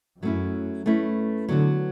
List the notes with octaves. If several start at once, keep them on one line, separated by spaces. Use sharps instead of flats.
F#2 F#3 A3 C#4 E4
A3 C#4 E4 B4
D3 F#3 B3 F#4